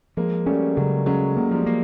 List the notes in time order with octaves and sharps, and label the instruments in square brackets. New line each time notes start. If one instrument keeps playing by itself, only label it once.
[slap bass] F3 [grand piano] G#3 A#3
[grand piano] G3 A3 [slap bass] C#4
[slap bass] C#3 [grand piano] F#3 G#3
[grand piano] F#3 G#3 [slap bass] C#4
[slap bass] A#3
[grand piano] F3 G3
[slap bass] A#3